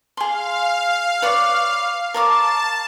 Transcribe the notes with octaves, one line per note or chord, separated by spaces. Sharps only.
G#4 F5 C6
B4 C#5 D5
A#4 C#5 A5 D6